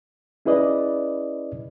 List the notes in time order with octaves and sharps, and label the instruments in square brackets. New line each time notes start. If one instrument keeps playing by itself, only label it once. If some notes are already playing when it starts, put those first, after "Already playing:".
[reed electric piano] C#4 E4 G#4 B4 D5 D#5